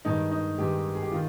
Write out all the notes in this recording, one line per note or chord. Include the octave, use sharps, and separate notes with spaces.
G2 D#3 G#3 D#4
D#4
G2 D#3 G#3 G4
G#4
G4
D#3 F4